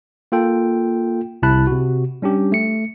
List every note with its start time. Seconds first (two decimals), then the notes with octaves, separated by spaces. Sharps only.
0.32 A#3 F4 A4 G5
1.42 C2 C3 E4 A5 B5 F#6
1.67 C3 F#4
2.22 G3 C#4 D4 G4
2.52 A3 C#7